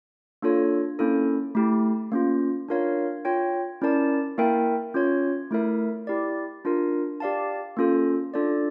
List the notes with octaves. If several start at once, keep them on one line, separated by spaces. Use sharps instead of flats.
A#3 D4 F4 A4 C#5
A#3 C#4 E4 A4
A3 E4 G4
A#3 C#4 F4
D4 F4 A#4 C#5 F5
F4 C#5 G5
C#4 E4 A#4 D5 A5
A#3 E4 A#4 E5 G5
C#4 F4 C#5
A3 E4 A#4 E5
E4 G4 D5
D4 F4 A#4
G4 D5 F5 A5
A#3 C#4 F4 A4
D4 F4 A4 D5